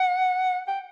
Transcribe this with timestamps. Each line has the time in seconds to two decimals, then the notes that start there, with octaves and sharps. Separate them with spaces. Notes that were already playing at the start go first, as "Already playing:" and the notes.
Already playing: F#5
0.68 G5